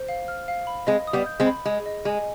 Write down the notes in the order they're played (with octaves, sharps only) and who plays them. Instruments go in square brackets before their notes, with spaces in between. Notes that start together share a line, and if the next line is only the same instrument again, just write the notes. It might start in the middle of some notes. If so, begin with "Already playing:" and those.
Already playing: [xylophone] C5
F5
F6
F5
B5
[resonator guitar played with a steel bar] G#3 C4 [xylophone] D#5
[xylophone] D#6
[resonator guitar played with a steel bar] G3 B3
[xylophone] G6
[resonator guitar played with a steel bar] G#3 C4
[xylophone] B5
[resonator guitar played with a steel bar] G#3 [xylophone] G#4
[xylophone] D#5
[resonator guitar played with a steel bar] G#3 [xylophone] G#5